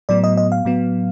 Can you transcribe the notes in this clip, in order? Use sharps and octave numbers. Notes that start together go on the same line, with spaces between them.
A2 F#3 B3 D5
D#5
D#5
F5
A2 F#3 B3